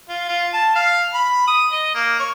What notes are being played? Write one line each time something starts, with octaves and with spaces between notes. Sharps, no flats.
F4
F4
A5
F5
B5
D#6
D#5
A#3
C#5